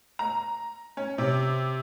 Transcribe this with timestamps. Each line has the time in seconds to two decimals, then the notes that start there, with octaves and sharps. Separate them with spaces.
0.19 A#5
0.97 C#4
1.18 C3